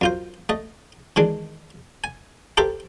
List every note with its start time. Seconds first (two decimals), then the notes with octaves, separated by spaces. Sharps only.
0.01 F#2 F4 C5
0.49 A3 D#5
1.16 D#3 E3 G#3 D4
2.04 G#5
2.57 G4 A4 A#4 C5 E5